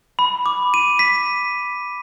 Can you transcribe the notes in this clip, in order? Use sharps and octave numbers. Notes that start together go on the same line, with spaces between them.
B5
D6
D#7
B6